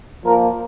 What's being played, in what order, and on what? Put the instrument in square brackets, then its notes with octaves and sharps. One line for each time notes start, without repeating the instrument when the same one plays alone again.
[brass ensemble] A#2 F3 A#3 A#4